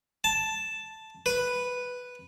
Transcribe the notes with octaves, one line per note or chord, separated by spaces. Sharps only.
A5
B4